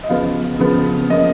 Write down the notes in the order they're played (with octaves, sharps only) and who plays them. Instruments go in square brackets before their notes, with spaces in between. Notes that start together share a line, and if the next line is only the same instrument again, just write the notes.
[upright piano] D#5
C#3 F3 B3 F5
C#3 F3 B3
F3 A#3 C#4 D#5